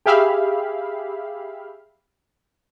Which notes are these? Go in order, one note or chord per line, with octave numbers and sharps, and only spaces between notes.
G4 G#4 E5 F5 B5